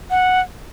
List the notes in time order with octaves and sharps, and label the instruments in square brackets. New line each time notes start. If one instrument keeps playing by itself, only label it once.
[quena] F#5